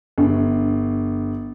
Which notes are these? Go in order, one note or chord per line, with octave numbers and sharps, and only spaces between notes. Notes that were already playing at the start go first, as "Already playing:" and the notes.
G1